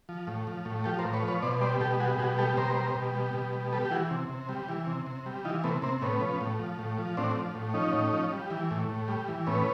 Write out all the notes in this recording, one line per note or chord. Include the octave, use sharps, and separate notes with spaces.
F3
A2
F3
A2
F3 G4 A4
A#4 C5
A2
B4 C#5
F3
B4 C#5
B2 C5 D5
G3 C5 D5
B2 G4 A4
G3 F#4 G#4
B2 F#4 G#4
G3 G4 A4
B2 A#4 C5
G3
B2
G3
B2
G3
G3 A4 B4
G4
E3 F#4 G#4
C3
C3
G3
E3
C3
C3
G3
E3 D#4 F4
C3 A3 B3
C3 A#3 C4
A2 B3 C#4
F3
A2
F3
A2
F3
A2 C4 D4
F3
A2
F3 C#4 D#4
A2
F3
G3
E3
A2
A2
G3
E3
A2 B3 C#4